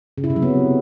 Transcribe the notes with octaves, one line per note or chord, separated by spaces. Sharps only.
C#3
E4
C3
F#3
B3